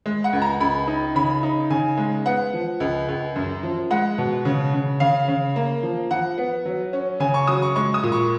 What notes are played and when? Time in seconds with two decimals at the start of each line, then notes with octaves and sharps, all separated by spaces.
0.06 G#3
0.24 F#5
0.33 C#2
0.42 A#5
0.61 C#2 B5
0.88 D#4
1.15 C#3 B5
1.43 D#4
1.70 C#3 G#5
1.98 G#3
2.26 B3 F#5
2.54 F3
2.80 C#2
3.09 C#2
3.36 F#2
3.63 F3
3.91 G#3 F#5
4.18 B2
4.45 C#3
4.73 C#3
5.00 C#3 F5
5.28 C#3
5.56 A#3
5.83 F3
6.11 F3 F#5
6.38 B3
6.66 F#3
6.93 C#4
7.20 C#3 G#5
7.34 C#6
7.47 F#3 D#6
7.62 C#6
7.76 G#3 C#6
7.94 D#6
8.03 A#2
8.12 C#6